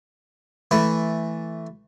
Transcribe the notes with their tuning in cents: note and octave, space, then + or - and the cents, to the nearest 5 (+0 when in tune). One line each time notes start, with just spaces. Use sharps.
E3 +0 A3 +0 B4 +0